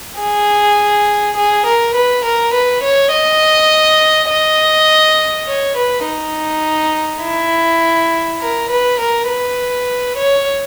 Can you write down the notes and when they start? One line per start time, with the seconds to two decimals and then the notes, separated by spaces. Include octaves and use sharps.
0.19 G#4
1.37 G#4
1.66 A#4
1.95 B4
2.24 A#4
2.54 B4
2.83 C#5
3.13 D#5
4.30 D#5
5.47 C#5
5.77 B4
6.06 D#4
7.23 E4
8.41 A#4
8.70 B4
9.00 A#4
9.29 B4
10.17 C#5